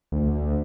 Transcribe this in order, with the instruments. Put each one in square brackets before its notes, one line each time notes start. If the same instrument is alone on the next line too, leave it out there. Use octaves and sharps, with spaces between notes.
[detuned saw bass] D2